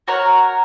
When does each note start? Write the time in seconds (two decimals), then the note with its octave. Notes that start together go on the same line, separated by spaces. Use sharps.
0.08 F#4 A#4 C#5 F#5